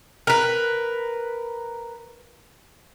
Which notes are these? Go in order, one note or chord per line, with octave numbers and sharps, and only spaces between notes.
A#4 B4